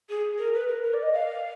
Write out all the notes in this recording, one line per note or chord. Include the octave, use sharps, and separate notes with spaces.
G#4
A#4
B4
A#4
A#4
D5
D#5
F5